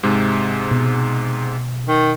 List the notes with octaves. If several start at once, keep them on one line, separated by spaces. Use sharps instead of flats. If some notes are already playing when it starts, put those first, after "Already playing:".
G#2 C3 G#3
B2
D#3